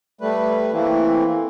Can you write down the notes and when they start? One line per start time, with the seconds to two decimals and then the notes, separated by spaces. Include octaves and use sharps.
0.21 G3 A3 B4
0.73 E3 A3 A#3 C4 E4